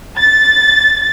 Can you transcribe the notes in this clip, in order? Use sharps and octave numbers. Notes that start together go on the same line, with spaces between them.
A6